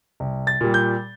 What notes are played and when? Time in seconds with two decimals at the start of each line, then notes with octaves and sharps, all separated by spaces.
0.20 C2
0.47 A6
0.61 A#2 G3
0.74 G6